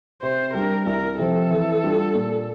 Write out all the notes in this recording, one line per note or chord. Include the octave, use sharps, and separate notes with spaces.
C3 C5
G3 D4 A#4
C2 A#4
C3 F3 C4 A4
E3
G3 D4 F4
A#2